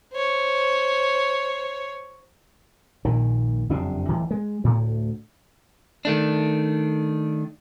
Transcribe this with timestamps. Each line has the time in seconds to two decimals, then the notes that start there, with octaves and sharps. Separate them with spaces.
0.13 C5 C#5
3.05 A#1 A#2 D#3
3.69 F#1 F2 C3 D4
4.08 D1 E3
4.31 G#3
4.64 D2 A2
6.05 D#3 A3 D4